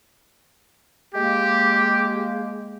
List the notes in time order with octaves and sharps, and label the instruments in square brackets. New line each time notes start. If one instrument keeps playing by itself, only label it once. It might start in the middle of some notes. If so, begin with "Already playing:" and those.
[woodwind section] G#3 A#3 [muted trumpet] G4